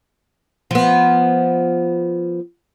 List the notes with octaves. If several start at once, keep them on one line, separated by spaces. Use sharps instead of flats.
F3 B3